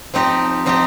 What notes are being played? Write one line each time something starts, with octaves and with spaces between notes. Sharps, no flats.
F3 C4 D#4 G4
F3 C4 D#4 G4